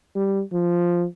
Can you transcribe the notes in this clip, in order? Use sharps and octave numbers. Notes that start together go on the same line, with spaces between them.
G3
F3